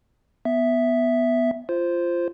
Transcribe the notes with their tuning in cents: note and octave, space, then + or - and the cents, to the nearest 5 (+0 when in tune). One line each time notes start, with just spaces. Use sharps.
B3 +0 E5 +0
F4 -15 C5 +0